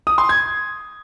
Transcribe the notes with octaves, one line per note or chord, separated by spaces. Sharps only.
D#6
C6
G#6